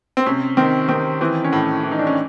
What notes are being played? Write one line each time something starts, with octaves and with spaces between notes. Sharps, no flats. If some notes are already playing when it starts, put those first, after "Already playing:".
C4
C3 C#4
D#3 C4
D#3 C4
E3 C4
C#4
A2
E3
D#4
D4
C#4